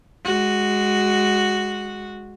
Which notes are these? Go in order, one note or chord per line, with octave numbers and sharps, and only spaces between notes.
G#3 F#4